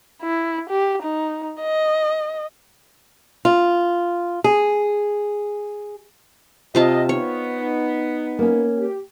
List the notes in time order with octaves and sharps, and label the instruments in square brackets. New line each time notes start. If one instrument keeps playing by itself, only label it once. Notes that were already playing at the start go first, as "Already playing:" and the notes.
[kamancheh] E4
G4
D#4
D#5
[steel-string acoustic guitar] F4
G#4
[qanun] C3 F4 A5 [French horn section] D#5
[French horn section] B3 D#4 [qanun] C#5
[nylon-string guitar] A#3 C#4
[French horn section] G4